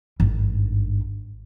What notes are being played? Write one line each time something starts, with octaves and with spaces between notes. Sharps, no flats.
G#1 G2